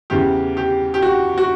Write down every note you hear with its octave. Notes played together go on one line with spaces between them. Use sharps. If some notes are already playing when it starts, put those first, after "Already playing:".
E2 C#3 E3 G4
G4
G4
F#4
F#4